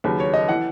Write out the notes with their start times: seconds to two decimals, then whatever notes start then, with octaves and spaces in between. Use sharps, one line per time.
0.04 D#2 C#3 F#3 B4
0.20 C#5
0.34 D#5
0.48 E3 F#5